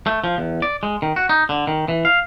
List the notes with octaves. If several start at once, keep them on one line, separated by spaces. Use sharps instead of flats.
A3
F3
E2
D5
G#3
D#3
F#4
D#4
D3
D#3
E3
F5